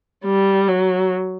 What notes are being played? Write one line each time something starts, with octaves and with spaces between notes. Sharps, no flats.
G3
F#3